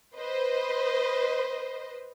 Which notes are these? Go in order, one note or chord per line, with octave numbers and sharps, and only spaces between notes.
B4 C5 D#5